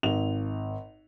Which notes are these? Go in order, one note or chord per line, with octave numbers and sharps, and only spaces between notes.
G#1 F7